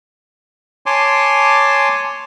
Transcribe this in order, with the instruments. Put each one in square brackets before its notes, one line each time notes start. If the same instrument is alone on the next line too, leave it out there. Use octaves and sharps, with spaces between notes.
[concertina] C#5 G#5 A5 C6 D6